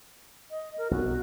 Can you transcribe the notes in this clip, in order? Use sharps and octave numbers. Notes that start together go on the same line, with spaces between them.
D#5
A#4
B1 F#4